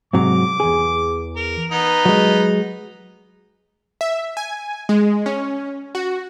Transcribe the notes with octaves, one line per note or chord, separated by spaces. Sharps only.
G#2 C3 F#3 D6
E2 G#4
A#4
B3 D#4
F#3 G#3
E5
G#5
G#3
C#4
F#4